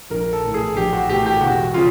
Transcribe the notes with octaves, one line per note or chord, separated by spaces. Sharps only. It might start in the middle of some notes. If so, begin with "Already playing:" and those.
A#1 A#4
A4
A2 E3 A3
G#4
A#1 G4
F#4
A2 E3 A3 G4
G4
E1 F#4
C#3 F3 F4